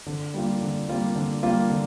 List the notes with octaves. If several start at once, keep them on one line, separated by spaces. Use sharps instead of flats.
D3
G3 A#3 F4
D3
G3 A#3 F4
D3
G3 A#3 F4
D3